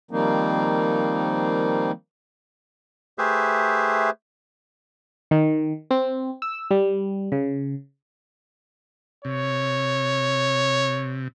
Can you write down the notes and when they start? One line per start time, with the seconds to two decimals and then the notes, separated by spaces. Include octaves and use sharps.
0.11 D#3 F3 G3 A#3 C4 D#4
3.18 A3 G4 G#4 B4 C5 E5
5.31 D#3
5.91 C4
6.42 E6
6.71 G3
7.32 C#3
9.25 C3 C#5